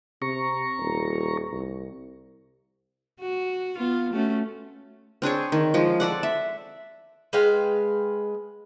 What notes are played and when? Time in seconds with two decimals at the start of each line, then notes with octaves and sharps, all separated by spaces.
0.22 C3 A#5 C#6
0.79 D#1
1.52 C2
3.21 F#4
3.77 B3 F4
4.13 A3 C#4 F#4
5.22 C4 D4 G#4 C#5
5.52 D#3
5.74 F3 G#3
6.00 A4 D5 F#5
6.23 E5
7.33 G#3 B4 F5 G5